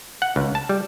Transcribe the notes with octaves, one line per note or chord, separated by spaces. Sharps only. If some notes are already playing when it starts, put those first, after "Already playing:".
F#5
C#2
A5
G3